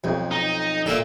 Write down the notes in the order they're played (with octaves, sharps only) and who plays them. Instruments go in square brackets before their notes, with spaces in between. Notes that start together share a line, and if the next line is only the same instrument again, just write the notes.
[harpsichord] B1 F2
[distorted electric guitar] D#4
[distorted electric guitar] A#2 [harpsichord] A4 E5